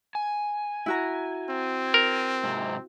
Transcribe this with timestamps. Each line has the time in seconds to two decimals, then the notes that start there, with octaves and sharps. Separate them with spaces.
0.15 G#5
0.86 E4 F#4 A#5
1.50 C4
1.94 A#4
2.44 G#2 C3